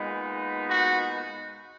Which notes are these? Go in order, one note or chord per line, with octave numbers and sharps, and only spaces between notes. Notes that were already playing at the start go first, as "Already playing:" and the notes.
Already playing: A#2 G#3 B3 D#4
F#4